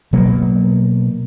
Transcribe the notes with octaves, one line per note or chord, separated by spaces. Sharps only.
B2 F#3 A#3